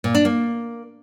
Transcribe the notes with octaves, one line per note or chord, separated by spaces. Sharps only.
A#2
D4
A#3